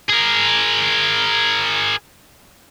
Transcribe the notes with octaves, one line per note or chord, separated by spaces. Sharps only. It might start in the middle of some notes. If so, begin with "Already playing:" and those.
G#4 A#4